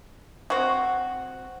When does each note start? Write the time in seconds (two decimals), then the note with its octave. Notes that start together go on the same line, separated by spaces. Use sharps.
0.50 C4 F#4